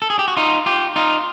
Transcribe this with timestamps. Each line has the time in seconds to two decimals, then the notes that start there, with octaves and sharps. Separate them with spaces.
0.02 A4
0.10 G#4
0.19 G4
0.28 F#4
0.37 D#4 F4
0.66 F4 G4
0.96 D#4 F4